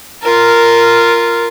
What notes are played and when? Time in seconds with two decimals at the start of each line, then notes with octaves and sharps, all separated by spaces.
0.22 F4 A#4